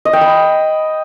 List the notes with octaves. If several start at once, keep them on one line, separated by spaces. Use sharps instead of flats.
D#5
G5
B5